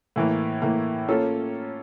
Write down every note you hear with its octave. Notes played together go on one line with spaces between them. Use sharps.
A2 E3 A#3
A2 E3 A#3
A#3 C#4 F4 A4